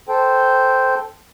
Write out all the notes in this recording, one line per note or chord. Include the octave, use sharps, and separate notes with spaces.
A4 C5 G5